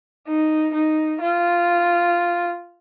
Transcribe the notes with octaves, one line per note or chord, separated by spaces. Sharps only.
D#4
D#4
F4